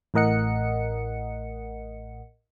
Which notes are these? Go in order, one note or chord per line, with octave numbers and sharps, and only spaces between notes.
A1 A2 A#4 D#5 F#5 C#7